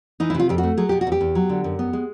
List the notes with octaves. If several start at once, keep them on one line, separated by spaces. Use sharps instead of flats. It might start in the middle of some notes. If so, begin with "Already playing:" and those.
E3 D#4
E4
C3
F4
F2 G4
F#4
A3
F#3 G#4
B2 G4
F#4
E2
G4
E2
F#3
D3
F#2
B3
G#3